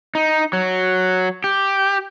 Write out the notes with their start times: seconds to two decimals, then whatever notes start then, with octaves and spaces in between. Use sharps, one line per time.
0.15 D#4
0.53 F#3
1.44 G4